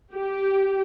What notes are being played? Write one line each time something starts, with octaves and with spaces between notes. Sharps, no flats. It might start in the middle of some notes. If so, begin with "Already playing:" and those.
G4